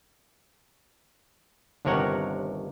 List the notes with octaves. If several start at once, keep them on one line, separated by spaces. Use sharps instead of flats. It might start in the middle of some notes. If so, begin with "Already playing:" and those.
G1 D#2 C3 A#4 C#5 F#5